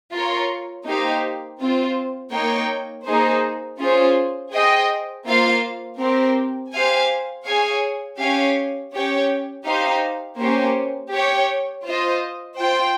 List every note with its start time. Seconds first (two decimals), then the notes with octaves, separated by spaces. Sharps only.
0.12 F4 A#4 C#5
0.86 A#3 D#4 G4 C5 F5
1.59 C4 F4 C5
2.32 A#3 D#4 A#4 C#5 G5
3.06 A#3 D#4 G#4 C5
3.79 C#4 F4 G#4 C5
4.52 G#4 C5 D#5 G5
5.26 A#3 F4 C5 F5
5.99 C4 G4 A#4
6.73 G4 C5 F5 G#5
7.46 G#4 C#5 F5 G#5
8.19 C#4 G4 C#5 F5 G#5
8.93 C#4 G4 C#5 G5
9.65 D#4 G4 C5 F5
10.39 A#3 C#4 G4 C5
11.12 G4 C#5 G5
11.86 F4 C5 D#5
12.59 F4 C5 G5